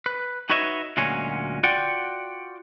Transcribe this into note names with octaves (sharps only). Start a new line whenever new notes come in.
B4
D#4 F#4 B4 C#5 D#5 E5
D2 A#2 F#3 G#3 C#4
F4 F#4 D5 F#5 G5